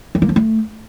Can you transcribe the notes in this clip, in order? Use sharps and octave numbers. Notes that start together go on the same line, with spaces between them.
E3
A#3
F3
A3